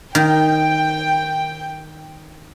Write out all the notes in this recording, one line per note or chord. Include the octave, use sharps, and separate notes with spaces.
D#3 G5